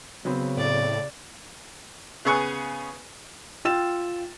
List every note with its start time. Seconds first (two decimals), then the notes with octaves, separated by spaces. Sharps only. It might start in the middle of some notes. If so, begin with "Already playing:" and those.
0.25 C#3 F#3 B3 C4
0.57 A2 D5
2.25 C#3 B3 G#4 C#6 F#6
3.65 F4 G5 E6 A6 E7